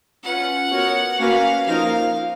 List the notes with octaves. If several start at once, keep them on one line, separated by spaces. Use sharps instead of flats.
C#4 F4 B4 F#5
B3 F#4 A#4 C#5
A#3 C#4 F#4 B4 F5
F3 A#3 D#4 A#4 F5